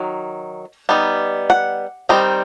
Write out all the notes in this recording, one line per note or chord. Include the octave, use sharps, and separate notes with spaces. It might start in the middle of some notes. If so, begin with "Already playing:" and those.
Already playing: D#3 F#3
G3 B3 D#4
F#5
D#3 G3 C4 D#4